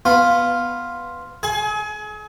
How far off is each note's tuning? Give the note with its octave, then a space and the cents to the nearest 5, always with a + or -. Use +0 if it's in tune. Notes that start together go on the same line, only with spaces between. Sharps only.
B3 +0 F4 +0
G#4 +40 G#5 +25